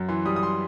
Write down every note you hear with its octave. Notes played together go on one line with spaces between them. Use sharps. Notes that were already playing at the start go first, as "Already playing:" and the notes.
Already playing: F#2
E3 C6
G3 D#6
D#6
C6